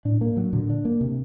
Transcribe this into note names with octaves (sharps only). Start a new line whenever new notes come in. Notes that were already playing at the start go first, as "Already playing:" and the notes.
A2 D4
A#3
F#3
A#2 D3
D4
A#3
C3